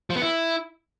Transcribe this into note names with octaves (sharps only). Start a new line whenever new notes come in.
F3
B3
E4